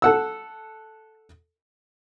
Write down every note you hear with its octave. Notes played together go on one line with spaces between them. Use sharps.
A4 F#5 E6